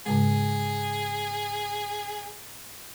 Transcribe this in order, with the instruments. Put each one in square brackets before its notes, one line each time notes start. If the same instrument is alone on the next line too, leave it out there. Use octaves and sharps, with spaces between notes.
[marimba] G#2 C#3 G#3 [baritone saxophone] G#4